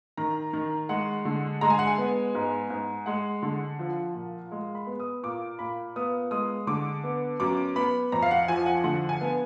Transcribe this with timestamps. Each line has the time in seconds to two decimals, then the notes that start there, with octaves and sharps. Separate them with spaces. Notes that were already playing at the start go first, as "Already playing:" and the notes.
0.17 D#3 A#5
0.53 D#3
0.89 G#3 F#5
1.25 D3
1.61 G#3 A#5
1.70 G#5
1.79 F#5
1.87 G#5
1.98 B3
2.35 G#2
2.70 G#2
3.06 G#3 F#5
3.43 D3
3.79 F3
4.14 A#2
4.52 G#3
4.75 B5
4.87 B3
5.00 D#6
5.23 A#2 D6
5.59 A#2 B5
5.96 B3 D#6
6.31 G#3 D#6
6.67 D3 D6
7.04 B3
7.40 F#2 D6
7.76 B3 B5
8.12 F2 A#5
8.22 F5
8.31 F#5
8.48 F3 G#5
8.66 F#5
8.84 D3 F#5
9.09 G#5
9.21 B3